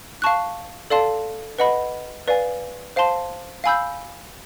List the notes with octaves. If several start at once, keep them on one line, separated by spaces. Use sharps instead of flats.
F5 A5 C#6 F#6
A4 D5 F5 A5 C6
B4 D#5 F#5 B5
B4 D5 F5 G#5
C5 F5 A5 C6
F5 G#5 B5 E6 G6